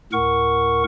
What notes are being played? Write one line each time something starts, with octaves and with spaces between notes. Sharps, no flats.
D2 A2 A#4 F#5 C#6